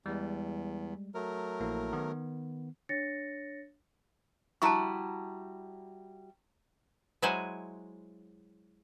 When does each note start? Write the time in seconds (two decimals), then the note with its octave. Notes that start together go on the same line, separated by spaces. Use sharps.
0.06 E2 G3 G#3
1.15 F#3 A3 A#4
1.60 A#1 A#3 E4
1.93 D#3 B3
2.89 D4 C#5 A6 A#6 C#7
4.62 G3 E4 F#4 A5 A#5 C#6
7.22 F#3 G#3 E4 C5 F#5 G#5